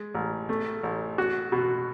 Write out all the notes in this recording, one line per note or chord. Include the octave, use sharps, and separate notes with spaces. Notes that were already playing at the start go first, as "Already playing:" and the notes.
Already playing: G#3
A1
A3
A1
F#4
B2